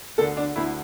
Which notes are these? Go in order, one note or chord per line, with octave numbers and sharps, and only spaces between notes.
D2 D3 A4
D4
D2 D3 E4